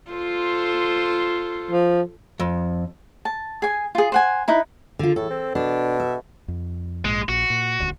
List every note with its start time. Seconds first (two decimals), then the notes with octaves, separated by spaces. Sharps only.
0.10 F4 A4 C5
1.71 F3
2.40 F2
3.25 A5
3.62 G#4 G#5
3.95 F4 G#4
4.12 C5 F#5 G#5
4.48 D#4 E4 B4
4.99 D3 F4
5.16 A2 A4
5.30 C4
5.55 B2 D4
6.00 E5
6.48 F2
7.05 A#1 G#2 G#3
7.29 A#1 F#4
7.50 A#2
7.80 D#1 D2